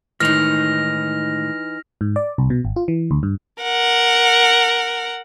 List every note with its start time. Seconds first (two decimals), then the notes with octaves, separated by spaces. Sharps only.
0.20 A2 D#3 E3 G#3 D#4 F6 A#6 F7
2.01 G#2
2.16 D5
2.38 C2
2.50 B2
2.65 G#1
2.76 F4
2.88 E3
3.11 D2
3.23 G2
3.63 A#4 F#5